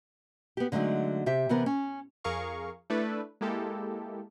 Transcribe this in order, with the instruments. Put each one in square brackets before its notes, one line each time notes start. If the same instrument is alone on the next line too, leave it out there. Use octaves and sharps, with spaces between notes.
[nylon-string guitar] B3 G4
D3 F#3 G#3 A3 D#4
C3 G4 E5
C3 E3 B3 A#4
C#4
[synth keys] F2 G#4 A#4 F5 C#6
A3 D4 E4 A4 B4 D5
G#3 A#3 E4 G4 A4